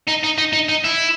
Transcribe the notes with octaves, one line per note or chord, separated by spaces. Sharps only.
D#4
D#4
D#4
D#4
D#4
E4